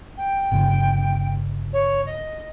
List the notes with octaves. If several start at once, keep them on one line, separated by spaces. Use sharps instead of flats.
G5
G1 G2 C#3
C#5
D#5